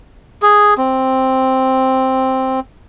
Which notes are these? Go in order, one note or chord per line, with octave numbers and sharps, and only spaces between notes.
G#4
C4